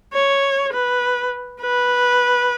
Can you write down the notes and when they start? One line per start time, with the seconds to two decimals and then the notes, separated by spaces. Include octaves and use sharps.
0.13 C#5
0.73 B4
1.61 B4